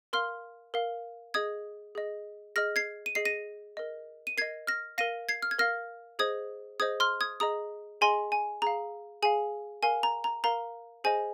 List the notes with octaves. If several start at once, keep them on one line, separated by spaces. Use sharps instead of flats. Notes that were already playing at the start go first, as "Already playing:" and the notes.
A#4 F5 C6 F6
A#4 F5
G#4 D#5 D#6 G#6
G#4 D#5
G#4 D#5 F6 A#6
G#6 C7
D#7
G#4 D#5 C7
A#6 D#7
A#4 D#5
D#7
A#4 D#5 G#6 C7
F6 A#6
A#4 F5 A#6 D#7
G#6 C7
F6
G#6
A#4 F5 F6 A#6
G#4 C5 D#5 D#6 G#6
G#4 C5 D#5 D#6 G#6
C6 F6
D#6 G#6
G#4 D#5 A#5 D#6
G#4 D#5 G#5 C6
G#5
G#4 F5 A#5
G#4 F5 G#5
A#4 F5 G#5
A#5
A#5
A#4 F5 A#5
G#4 C5 D#5 G#5